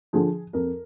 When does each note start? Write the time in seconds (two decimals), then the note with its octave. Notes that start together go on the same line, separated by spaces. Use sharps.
0.13 D3 F3 G#4
0.53 F2 A#4